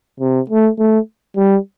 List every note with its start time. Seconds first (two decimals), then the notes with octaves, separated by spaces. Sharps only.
0.20 C3
0.49 A3
0.78 A3
1.36 G3